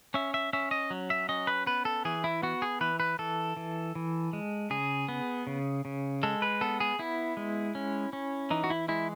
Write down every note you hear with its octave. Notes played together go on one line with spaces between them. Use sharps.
C#4 E5
E5
C#4 E5
D#5
F#3
E5
C#4 D#5
B4
B3 B4
A4
E3 G#4
E4
B3 F#4
G#4
E3 B4
B4
E3 A4
E3
E3
G#3
C#3 G#4
B3
C#3
C#3
G#3 A4
B4
B3 A4
G#4
B3 E4
G#3
C#4
C#4
E3 D#4
F#4
E4
G#3 E4